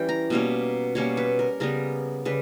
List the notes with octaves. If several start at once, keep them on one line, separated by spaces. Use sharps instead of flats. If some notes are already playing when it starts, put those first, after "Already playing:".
Already playing: E3 G3 C#4 G5
A#5
B2 G3 A#3 C#4
B2 G3 A#3 C#4 C#5
B4
A#4
C#3 G3 B3 A#4
C#3 G3 B4